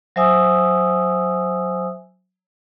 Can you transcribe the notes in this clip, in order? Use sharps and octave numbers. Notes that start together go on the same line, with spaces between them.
F#3 C5 E5 G#5 D#6 E6